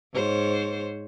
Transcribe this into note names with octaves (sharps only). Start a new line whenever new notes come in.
G#2 C5 C#5